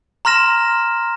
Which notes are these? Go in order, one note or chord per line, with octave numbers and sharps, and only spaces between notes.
A#5 C6 F6 A#6 E7